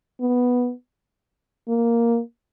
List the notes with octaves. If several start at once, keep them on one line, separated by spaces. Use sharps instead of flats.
B3
A#3